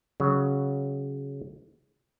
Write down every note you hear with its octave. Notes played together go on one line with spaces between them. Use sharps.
C#3 F#3